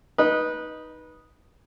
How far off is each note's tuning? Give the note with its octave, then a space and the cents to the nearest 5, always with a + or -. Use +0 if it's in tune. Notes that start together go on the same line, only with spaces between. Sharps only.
D#4 +0 B4 -20 D#5 +0